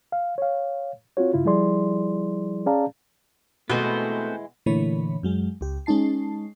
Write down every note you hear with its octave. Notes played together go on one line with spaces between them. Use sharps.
F5
C#5 F5
C4 F4 F#4 C#5
G2 C#3 E4 F4
F3 G3 E4 G#4 D5 C6
C#4 G#4 D5 F5 A5 A#5
B2 E3 G#3 A3 B3 C4 C5
A#2 D3 E3 A3 C#5 B5
F#2 F#3 G#3
C#2 G4
G#3 C#4 D#4 A5 C7